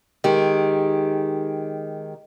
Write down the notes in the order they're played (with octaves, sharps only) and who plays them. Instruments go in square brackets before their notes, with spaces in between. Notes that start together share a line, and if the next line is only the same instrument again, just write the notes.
[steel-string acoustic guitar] D#3 G#3 G4